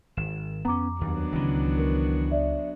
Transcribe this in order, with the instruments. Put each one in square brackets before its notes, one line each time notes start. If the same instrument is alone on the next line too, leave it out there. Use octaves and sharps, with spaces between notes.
[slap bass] G#1 [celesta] E7
[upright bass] F2 [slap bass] B3 C#4 [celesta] A#5 D6
[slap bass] D#2 [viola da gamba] F#3 B3 D4
[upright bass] C#2 [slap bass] D#3 E3
[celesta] A#4
D5 E5